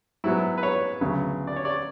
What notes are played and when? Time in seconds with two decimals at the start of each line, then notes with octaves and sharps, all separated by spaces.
0.24 G#2 F#3 B3 E4
0.57 B4
0.63 C#5
1.01 D2 C#3 F#3 B3
1.47 D5
1.56 C#5
1.65 D5